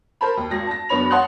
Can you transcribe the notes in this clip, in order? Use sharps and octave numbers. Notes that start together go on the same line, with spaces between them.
A#4 C5 A5 B5
D#2
G#1 A#6
A5 A#6
F#1 B3 D4 C#5 B5 F7
C#5 F#5 A5 C6 D#6 F#6